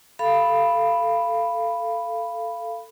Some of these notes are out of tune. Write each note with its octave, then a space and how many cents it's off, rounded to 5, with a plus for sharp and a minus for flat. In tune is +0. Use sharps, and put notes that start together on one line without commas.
A4 +0 F5 -20 B5 +0